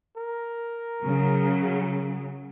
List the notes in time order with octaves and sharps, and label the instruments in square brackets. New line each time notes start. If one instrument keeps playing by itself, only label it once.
[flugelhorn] A#4
[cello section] C#3 F#3